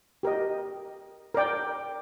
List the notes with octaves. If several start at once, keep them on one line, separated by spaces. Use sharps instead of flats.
G4 A#4 D#5
A#4 D5 G5